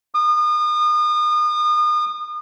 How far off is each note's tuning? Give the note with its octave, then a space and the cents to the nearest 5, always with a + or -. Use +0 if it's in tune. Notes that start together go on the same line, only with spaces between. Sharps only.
D#6 -35